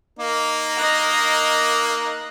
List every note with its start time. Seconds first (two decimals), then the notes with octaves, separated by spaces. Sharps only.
0.19 A#3 D#4 A#4
0.77 D#5 F#6